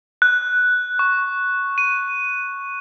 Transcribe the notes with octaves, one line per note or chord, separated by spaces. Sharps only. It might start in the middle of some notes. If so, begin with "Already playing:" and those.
F#6
C#6
D#7